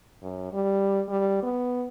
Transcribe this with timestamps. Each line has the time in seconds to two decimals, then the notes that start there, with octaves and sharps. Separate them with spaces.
0.22 F#2
0.53 G3
1.09 G3
1.42 B3